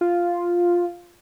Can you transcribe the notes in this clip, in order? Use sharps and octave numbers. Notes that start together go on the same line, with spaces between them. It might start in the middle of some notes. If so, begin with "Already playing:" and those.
F4